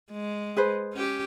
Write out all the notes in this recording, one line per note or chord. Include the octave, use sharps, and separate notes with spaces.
G#3
G#4 B4 C5
C#4 G4